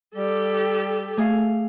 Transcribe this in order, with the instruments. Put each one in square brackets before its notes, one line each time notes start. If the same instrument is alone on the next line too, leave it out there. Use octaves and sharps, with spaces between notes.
[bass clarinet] G3 [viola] G4 A4
[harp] A3 G#4 F5